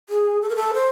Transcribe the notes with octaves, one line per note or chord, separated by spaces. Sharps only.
G#4
A4
A#4
A4
C5